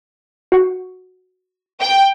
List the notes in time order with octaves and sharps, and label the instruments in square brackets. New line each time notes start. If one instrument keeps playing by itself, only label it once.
[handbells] F#4 F#5
[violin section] G5